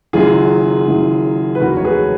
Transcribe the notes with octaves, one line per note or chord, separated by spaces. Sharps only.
F#1 F#2 D#3 F#3 F4 G#4
F#1 F#2 D#3 F#3
B4
F1 D#2 D#3 F#3 F#4 A#4
C#5
G#4 B4